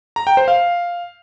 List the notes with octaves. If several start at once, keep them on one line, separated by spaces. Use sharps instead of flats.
A#5
G5
C5
F5